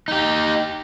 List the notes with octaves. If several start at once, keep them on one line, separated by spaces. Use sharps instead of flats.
D#4 G4